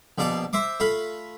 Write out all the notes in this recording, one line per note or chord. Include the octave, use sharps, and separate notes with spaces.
A#1 B2 D5 F5 A5 D6
C5 E5 C6 D6
A3 F4 F5 B5